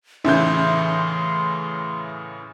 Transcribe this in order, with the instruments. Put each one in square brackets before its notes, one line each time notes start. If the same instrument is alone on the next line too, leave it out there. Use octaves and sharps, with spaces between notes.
[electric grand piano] A2 C#3 E3 [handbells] C#4 D#4 [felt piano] E5 G6 [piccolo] C6